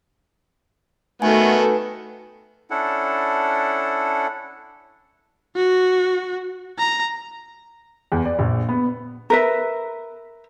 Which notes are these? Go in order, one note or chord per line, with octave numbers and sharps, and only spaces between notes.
D#3 A3 B3 F#4 A4 B4 G#5
C#4 D4 E4 A4 F#5
F#4
A#5
E2
D5
A#1
B3
A#4 B4 E5